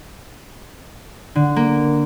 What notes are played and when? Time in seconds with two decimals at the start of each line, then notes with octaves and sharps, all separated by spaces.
1.35 D3
1.56 A#3